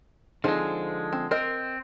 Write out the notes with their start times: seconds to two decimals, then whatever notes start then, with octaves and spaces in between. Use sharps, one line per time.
0.44 D3 F3 G#3 C4 D#4 G#4
1.13 C4
1.31 C4 A#4 D#5